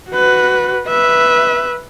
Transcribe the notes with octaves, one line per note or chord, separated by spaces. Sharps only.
F#4 B4
B4 E5